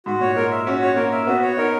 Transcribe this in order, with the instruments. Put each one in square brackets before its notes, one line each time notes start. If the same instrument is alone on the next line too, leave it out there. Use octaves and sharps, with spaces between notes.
[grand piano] G#2 [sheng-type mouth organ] F#4
[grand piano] A#2 [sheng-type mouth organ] C#5
[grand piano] G#3 [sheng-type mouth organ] A#4
[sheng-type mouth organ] E5
[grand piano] C#4 [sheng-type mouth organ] F#4
[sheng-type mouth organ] C#5
[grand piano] A#3 [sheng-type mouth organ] A#4
[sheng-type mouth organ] E5
[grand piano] B3 [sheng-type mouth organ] F#4
[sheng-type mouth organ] C#5
[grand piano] D#4 [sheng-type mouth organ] A#4